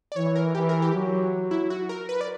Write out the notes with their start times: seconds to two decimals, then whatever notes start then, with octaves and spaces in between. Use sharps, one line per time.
0.12 D5
0.16 E3 C#5
0.36 A#4
0.55 E3 G4
0.69 A#4
0.82 G4
0.94 F#3
1.51 E4
1.70 F#4
1.89 A#4
2.09 B4
2.21 D5